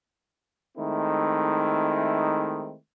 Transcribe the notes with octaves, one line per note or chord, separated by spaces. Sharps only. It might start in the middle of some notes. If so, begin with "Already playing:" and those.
D#3 G#3 A3 C4 D#4 E4